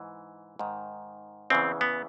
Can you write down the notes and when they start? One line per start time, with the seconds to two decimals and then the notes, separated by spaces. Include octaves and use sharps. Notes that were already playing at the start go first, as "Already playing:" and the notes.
Already playing: G#2 E3
0.59 G#2 D#3
1.50 E2 C#3 E3 C4
1.81 B3